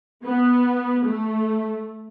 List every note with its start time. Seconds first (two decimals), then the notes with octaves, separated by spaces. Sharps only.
0.24 B3
1.04 A3